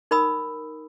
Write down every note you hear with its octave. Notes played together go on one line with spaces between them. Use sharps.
D#4 A#4 G#5 B5 D#6 E6